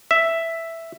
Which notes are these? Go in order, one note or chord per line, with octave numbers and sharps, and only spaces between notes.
E5